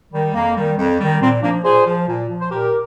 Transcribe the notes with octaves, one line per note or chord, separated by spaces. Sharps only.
D#3 G3
F2 A#3
D#3 G3
F2
D#3 G3
A#2 C4
F3 A#3 D4
A#2 G#4 C5
F3
A#2
F3
C5
A#2 G4 A#4